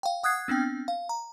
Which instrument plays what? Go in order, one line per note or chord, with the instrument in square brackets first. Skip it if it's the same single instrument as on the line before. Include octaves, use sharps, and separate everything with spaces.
[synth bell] F5 G5
F#5 D#6 F#6 G#6 C7
B3 C4 D4 G5
F5
A#5